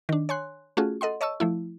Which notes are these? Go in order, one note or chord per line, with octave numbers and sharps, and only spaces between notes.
D#3 D4
C#5 G#5 C6 F#6
A3 C#4 F4 F#4 G#4
A4 D#5 F#5 C6
C#5 D#5 A5 C#6 E6
F3 A3 E4